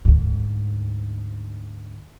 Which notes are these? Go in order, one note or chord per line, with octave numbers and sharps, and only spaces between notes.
D2 G#2